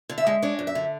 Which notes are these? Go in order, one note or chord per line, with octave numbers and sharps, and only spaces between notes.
D3
E5
G#3
D4 C#5
F#2
E5
D3